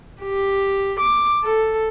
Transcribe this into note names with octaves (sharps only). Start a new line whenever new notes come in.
G4
D6
A4